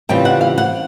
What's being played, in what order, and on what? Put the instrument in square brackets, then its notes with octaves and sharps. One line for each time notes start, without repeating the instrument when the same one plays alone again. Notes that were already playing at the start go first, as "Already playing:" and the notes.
[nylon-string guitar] C#3 E3 G3 C4 F4 G5
F#5
F5
F#5